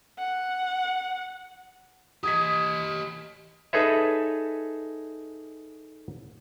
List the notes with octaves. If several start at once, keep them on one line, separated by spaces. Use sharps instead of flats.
F#5
G4 D#5 D#6 G#6 B6
D#4 G#4 A4 B4 C#5 E5